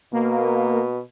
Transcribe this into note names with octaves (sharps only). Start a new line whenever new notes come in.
B2 A#3